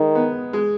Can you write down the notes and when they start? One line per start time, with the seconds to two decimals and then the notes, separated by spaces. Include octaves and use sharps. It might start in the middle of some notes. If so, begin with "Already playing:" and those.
Already playing: D#3 G#3
0.15 B3
0.53 G#3